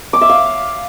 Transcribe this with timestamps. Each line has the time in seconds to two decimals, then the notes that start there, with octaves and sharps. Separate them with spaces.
0.13 D6
0.21 E5
0.29 F5